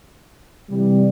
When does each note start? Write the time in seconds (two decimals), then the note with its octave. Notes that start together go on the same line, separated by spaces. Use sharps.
0.69 C3 E3 G3